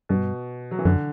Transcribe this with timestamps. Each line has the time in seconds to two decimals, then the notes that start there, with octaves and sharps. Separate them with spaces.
0.09 G2 B2
0.71 F#3
0.79 E3
0.85 F#2 D3